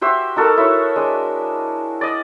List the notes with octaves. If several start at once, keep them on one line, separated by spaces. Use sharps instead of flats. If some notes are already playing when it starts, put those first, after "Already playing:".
F#4 G4 C5 E5
D#4 F#4 A4 A#4
E4 C#5 E5
G#3 D4 C5
D5 D#5